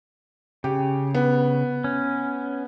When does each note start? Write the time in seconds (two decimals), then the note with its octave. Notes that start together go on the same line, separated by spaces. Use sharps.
0.64 C#3 G4
1.14 B3
1.84 C#4